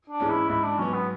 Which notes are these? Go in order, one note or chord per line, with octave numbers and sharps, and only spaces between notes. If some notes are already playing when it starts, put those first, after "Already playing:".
D4
G#2 E3 G#3 C#4
E4
G#2 E4
D4
F#3 B3 C#4
B3